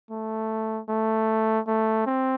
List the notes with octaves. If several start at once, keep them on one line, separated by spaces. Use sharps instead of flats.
A3
A3
A3
C4